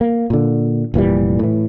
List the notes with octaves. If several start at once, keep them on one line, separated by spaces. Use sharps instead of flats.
A#3
A#2 D3
F1 A#2 E3 G3
A2 E3